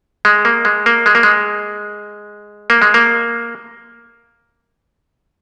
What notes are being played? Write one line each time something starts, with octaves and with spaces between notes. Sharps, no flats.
G#3
A#3
G#3
A#3
G#3
A#3
G#3
A#3
G#3
A#3